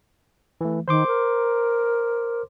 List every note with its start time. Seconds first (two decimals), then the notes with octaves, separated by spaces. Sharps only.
0.61 E3 A3
0.88 D#3 C5 C6 D6
1.07 A#4